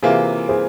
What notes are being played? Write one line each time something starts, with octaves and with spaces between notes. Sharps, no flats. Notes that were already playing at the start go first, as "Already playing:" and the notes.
C3 E3 A#3 F4 G#4 C5
G#4 C5